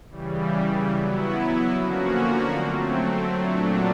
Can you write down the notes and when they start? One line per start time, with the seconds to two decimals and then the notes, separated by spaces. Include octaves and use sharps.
0.10 C#3 E3 G3
0.90 F#3 B3 E4
1.72 D3 F3 A#3 C#4 F#4
2.53 F#3 A3 C4
3.35 A#2 F#3 A3 D4